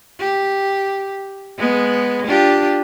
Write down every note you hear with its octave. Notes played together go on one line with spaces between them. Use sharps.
G4
G#3 B3
D4 F4 G4